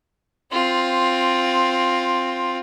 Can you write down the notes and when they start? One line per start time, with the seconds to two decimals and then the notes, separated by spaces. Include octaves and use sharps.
0.52 C4 F4